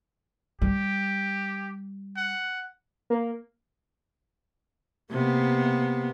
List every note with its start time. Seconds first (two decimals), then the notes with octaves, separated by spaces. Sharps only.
0.62 G3 G4
2.17 F#5
3.10 A#3
5.11 C3 A#3 B3